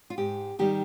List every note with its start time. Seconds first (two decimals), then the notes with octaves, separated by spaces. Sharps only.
0.10 F4
0.18 G#2 G4
0.59 D#3 G3 G4